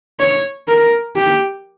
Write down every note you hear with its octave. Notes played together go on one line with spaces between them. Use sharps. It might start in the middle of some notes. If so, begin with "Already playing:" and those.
C#5
A#4
G4